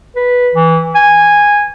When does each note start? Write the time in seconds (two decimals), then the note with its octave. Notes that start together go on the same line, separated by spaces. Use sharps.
0.16 B4
0.54 E3
0.95 G#5